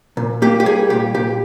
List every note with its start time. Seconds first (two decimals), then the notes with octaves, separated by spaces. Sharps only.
0.17 A#2
0.42 A#3 G4
0.60 G4
0.65 G3 G#4
0.90 A#2 G4
1.14 A#2 G4